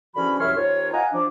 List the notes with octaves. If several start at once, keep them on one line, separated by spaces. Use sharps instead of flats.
E2 D3 F3 C#4 F#4 B5
C2 F#2 C#5 E5 C6 F6
D#2 C4 D#4 F4 C#5
D#5 F5 F#5 G#5 A#5
F3 D4